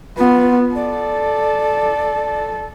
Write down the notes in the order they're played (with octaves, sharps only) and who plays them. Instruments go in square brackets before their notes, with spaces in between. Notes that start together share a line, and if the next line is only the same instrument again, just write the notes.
[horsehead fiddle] B3 [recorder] F4
[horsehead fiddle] A4 [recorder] D5